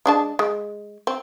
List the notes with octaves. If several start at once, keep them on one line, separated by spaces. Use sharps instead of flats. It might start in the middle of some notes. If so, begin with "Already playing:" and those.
G#3 D4 A5
G#3
C4